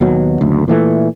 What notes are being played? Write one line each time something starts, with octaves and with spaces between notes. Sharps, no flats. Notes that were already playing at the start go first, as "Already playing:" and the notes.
D#2 B2 F#3
F#1 D2
A#2 E3 A3